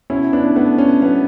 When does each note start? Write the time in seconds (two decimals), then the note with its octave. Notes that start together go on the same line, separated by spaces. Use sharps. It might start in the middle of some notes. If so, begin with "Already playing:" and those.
0.10 B2 C#4 E4
0.33 B3 D4
0.55 A3 B3
0.78 C#4
1.02 F#3 B3